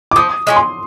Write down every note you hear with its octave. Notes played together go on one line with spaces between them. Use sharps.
D6
F3 D#6
G#3 C#4 F4
C6